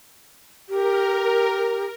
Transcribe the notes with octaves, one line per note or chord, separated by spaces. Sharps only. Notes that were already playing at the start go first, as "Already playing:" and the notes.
G4 A#4